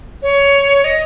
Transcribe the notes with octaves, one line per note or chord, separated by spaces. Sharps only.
C#5
D#5